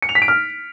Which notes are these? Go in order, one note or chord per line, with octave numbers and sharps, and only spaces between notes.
C#7
F7
B6
D7
F6